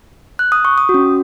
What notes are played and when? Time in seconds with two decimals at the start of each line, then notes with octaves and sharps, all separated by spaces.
0.39 F#6
0.52 D#6
0.65 C#6
0.78 D#6
0.89 F#4
0.94 C#4